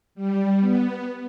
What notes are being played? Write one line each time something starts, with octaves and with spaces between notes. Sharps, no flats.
G3
B3